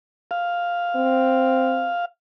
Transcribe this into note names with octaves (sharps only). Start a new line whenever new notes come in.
F5
C4